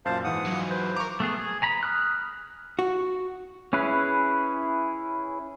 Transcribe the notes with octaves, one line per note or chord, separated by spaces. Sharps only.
F#2 A#2 C5 F5 A5
G#2 E3 F#5 D#6
F#3 F4
B4 C5
A#4 A#5 C#6 D6
A3 B3 G#4
G#4
G#5 A#5 B5
D#6 F6 F#6
F#4
C#4 E4 G#4 B4